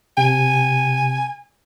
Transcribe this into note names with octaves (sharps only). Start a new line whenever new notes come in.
C3 G#5